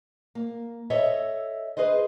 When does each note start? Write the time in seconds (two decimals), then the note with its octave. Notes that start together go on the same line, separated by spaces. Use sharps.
0.35 A#3
0.90 A4 C#5 D#5 E5
1.77 G#4 B4 C5 D#5